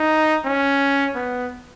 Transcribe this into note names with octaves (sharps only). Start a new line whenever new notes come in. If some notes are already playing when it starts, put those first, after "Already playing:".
Already playing: D#4
C#4
B3